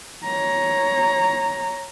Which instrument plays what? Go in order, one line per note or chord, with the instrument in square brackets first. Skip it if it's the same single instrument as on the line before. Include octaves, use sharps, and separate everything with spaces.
[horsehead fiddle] C#5 A#5